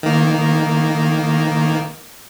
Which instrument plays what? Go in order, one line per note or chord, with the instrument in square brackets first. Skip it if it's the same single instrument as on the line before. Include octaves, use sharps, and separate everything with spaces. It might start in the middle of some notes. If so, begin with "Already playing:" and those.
[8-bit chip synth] D#3 A#3